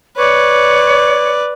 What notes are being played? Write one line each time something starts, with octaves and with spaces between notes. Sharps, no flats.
B4 C#5 D5